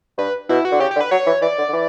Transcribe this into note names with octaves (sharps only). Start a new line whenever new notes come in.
G2 B4
B2 E4
F#4
D3
C#3 G4
G4
D3
B4
F#3 C#5
E3
E3 D5
D3
D3
E3